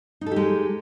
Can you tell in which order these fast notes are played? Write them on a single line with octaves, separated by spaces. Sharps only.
D#4 A4 G4 G#3